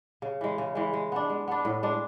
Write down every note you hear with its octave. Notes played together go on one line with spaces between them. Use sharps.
C#3
E3 G#3
C#3
E3 G#3
G#3
B3 D4
G#3
B3 D4
A2
G#3 D4